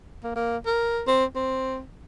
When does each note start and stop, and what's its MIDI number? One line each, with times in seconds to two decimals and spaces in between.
0.24 0.32 58
0.36 0.57 58
0.66 1.02 70
1.07 1.25 60
1.35 1.80 60